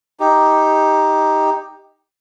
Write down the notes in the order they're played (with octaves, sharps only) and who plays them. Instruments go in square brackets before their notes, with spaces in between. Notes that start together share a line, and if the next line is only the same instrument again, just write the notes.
[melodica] D#4 G4